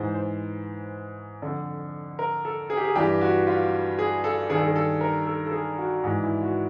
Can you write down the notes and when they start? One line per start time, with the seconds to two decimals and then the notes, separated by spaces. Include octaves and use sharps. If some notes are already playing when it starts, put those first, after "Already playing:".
Already playing: G#2 E3 C5
0.14 C5
1.42 F2 D3
2.19 A#4
2.45 A4
2.70 G#4
2.77 G4
2.84 G#4
2.96 G2 E3 G4
3.21 F#4
3.47 F4
3.99 G#4
4.24 A4
4.50 D#3 G#4
4.54 G2 A4
4.66 G#4
4.76 A4
5.01 A#4
5.27 A4
5.46 A4
5.52 G#4
5.78 F#4
6.04 G#2 E3
6.23 E4
6.42 F#4